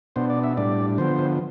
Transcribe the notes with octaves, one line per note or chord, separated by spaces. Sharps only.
B2 B3 D4 C5
D5
E5
A2 G3 D4 D5
D3 F3 B3 C5